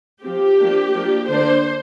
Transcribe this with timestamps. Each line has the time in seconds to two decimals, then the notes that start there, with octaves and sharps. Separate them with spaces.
0.23 F3 C4 G4
0.59 F3 A#3 D4
0.94 F3 A#3 D4
1.29 D3 A#3 D4 C5